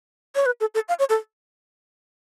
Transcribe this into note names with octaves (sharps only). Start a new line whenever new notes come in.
C#5
B4
A4
A4
F5
C#5
A4